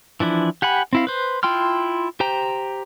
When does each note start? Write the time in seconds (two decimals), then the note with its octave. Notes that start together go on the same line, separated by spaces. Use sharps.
0.20 E3 F3 D4 E4
0.62 G4 F#5 G#5 B5
0.93 C4 E4 F5
1.07 B4 C5
1.43 E4 F4 G5 C6 F6
2.20 G4 C5 G5 A#5